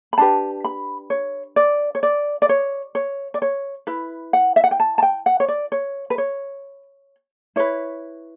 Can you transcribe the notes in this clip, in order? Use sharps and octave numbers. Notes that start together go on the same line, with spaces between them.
B5
D4 G4 B4 A5
B5
C#5
D5
C#5
D5
D5
C#5
C#5
D5
C#5
E4 B4
F#5
E5
F#5
G5
A5
A5
G5
F#5
C#5
D5
C#5
B4
C#5
E4 B4 C#5